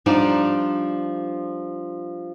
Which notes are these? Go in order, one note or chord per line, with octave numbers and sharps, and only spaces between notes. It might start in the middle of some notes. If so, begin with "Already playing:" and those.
F3 G3 D4 D#4 F4